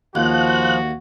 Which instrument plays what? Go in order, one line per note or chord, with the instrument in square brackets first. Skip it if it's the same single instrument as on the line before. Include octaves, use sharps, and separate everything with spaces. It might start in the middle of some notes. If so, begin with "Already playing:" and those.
[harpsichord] D#2 [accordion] F3 [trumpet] F#4 [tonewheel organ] F#6